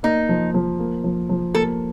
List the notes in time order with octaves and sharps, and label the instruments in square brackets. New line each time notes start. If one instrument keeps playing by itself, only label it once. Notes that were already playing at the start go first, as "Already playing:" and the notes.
[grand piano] A#3 [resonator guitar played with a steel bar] D#4
[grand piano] F3
F3
A#3
F3
F3
[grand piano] A#3 [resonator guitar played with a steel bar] A4